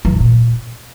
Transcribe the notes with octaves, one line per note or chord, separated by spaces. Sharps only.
E3
A2
G2
A#2